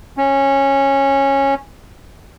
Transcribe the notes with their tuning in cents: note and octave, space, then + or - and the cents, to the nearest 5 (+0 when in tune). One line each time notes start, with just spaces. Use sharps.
C#4 -15